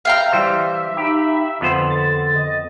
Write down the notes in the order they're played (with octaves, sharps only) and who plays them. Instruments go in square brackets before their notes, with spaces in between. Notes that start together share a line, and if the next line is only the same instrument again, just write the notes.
[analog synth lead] E5 [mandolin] F5 G5 A#5
[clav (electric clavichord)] E3 G3 C5
[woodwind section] D#4 B5 [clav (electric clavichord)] G4
[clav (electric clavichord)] F2 B3 C5 [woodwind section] D3 [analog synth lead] B5
[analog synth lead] A6
[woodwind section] D#5